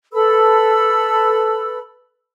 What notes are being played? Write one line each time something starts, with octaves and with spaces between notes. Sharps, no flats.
A4 B4 B5 E6